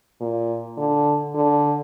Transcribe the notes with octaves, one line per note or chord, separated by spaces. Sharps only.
A#2
D3
D3